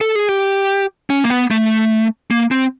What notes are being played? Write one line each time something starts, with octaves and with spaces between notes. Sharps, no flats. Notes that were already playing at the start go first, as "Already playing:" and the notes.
A4
G#4
G4
C#4
A#3
B3
A3
A#3
C4